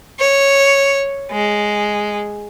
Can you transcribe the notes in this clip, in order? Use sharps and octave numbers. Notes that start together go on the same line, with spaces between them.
C#5
G#3